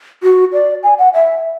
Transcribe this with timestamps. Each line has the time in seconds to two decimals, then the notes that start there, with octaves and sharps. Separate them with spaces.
0.23 F#4
0.53 D5
0.83 G#5
0.99 F#5
1.14 E5